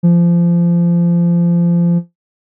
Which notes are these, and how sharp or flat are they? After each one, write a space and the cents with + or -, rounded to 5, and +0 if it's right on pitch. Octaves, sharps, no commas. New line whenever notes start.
F3 -25